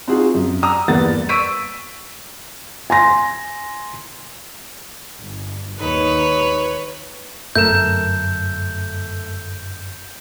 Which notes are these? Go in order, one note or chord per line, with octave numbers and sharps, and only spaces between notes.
C4 D#4 F4 F#4 G#4
F#2
A#5 D#6 E6
E2 G2 A#3 B3 F#5 A6
C#6 E6 B6 D7 D#7
G#5 C6 A#6
G1
D#2 D#4 B4 C#5
G1 F#2 A3 A#4 G6 E7